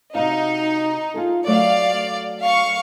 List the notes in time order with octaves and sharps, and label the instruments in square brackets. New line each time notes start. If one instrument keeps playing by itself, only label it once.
[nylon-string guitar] C3 F#4 F5 [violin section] D#4
[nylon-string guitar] F4 G#4 A4
[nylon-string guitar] F#3 A3 [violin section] D5 F5
[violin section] F5 C#6